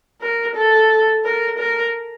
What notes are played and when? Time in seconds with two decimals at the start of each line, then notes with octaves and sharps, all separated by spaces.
0.21 A#4
0.56 A4
1.24 A#4
1.58 A#4